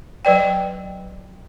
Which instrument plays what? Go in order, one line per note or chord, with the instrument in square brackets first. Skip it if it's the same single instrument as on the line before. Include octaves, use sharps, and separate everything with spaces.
[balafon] F#3 B4 D5 G5